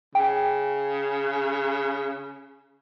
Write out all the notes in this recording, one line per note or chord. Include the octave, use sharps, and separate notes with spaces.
C#3 G5